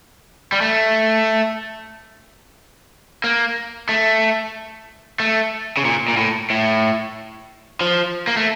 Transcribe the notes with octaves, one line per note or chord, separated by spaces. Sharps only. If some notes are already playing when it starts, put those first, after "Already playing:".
G3
A3
A#3
A3
A3
C#3
A#2
A#2
A2
A2
F3
A#3
A3